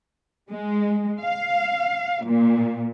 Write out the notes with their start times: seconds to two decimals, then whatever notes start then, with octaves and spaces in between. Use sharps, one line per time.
0.50 G#3
1.20 F5
2.24 A#2